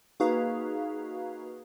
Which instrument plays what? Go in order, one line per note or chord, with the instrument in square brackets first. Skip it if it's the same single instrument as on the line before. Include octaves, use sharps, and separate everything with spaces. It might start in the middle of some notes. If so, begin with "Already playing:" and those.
[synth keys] A#3 D#4 F#4 G#4 B4 F5